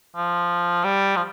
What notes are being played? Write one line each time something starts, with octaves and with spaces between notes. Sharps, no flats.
F3
G3
F3